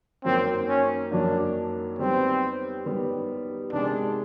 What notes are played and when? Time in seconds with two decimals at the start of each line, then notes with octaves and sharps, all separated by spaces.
0.24 F#2 D#3 F#3 A#3 C4
0.69 C#4
1.12 F#2 D#3 F#3 A#3 D4
1.99 D#3 G3 B3 C4
2.86 D#3 G3 B3
3.72 C3 D#3 G#3 D4